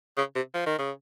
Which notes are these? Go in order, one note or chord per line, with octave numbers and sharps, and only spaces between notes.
C#3
C3
F3
D#3
C#3